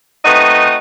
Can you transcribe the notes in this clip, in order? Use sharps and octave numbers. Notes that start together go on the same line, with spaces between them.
A3 C4 D#4 F#4 B4 D#5